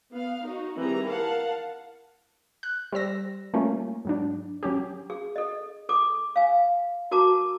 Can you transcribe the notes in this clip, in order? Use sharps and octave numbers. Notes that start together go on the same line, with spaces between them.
B3 F5
D#4 F#4
D#3 E3 G3 C4 G#4 A#5
A#4 F5 F#5 A5
F#6
G3 C5 E6 A#6
G3 A3 A#3 C#4 F4
G#2 F#3 D4
F#3 C#4 G4
G#4
A4 D#5
A4 D6
F5 G#5
F#4 A#4 A5 A#5 D6